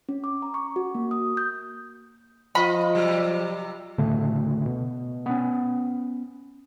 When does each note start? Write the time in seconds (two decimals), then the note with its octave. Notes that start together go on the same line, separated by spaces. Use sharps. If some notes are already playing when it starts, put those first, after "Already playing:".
0.09 C#4
0.24 D6
0.42 A#5
0.54 C#6
0.76 F#4
0.95 A#3
1.11 D#6
1.37 G6
2.55 F3 F4 D#5 B5
2.95 C3 F#3 G3
3.98 D2 A2 C#3 A3
4.66 B2
5.26 B3 C#4